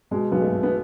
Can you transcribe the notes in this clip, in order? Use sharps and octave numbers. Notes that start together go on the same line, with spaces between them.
B2 G#3
B1 B3
A3
B2
B3